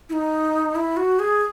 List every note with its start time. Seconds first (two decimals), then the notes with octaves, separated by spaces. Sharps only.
0.09 E4
0.13 D#4
0.76 E4
0.97 F#4
1.19 G#4